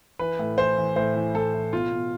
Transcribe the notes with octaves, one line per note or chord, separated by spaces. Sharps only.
E3 B4
A2
E3 C5
E3
A2 C5
E3
A2 A4
E3
B2 F4
B2